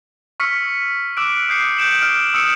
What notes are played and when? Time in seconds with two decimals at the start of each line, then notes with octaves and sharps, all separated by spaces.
0.40 C#6 E6 F6 B6 C#7
1.17 D6 E6 F#6 D7
1.49 D#6 G6 C7 C#7
1.77 G6 D7 E7 F#7
2.00 F6 C7 D7
2.34 D#6 E6 C#7 D7 E7 F#7